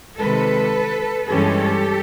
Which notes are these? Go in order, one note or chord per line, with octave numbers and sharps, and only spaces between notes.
C3 D#3 G#3 A4 B4
G2 E3 G#3 C#4 G4 A4